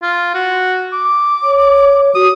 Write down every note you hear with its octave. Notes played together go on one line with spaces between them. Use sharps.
F4
F#4
D6
C#5
F#4 D#6